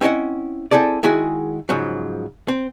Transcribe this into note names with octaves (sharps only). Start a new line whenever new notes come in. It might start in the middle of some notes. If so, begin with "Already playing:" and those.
C4 C#4 E4 D#5 F#5
C4 E4 G#4 A4 D5
D#3 G#3 E4 F#4 G#4
G#2 C#3 F3 F#3
C4